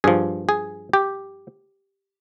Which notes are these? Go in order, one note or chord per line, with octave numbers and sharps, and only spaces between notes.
G2 F3 G#4
G#4
G4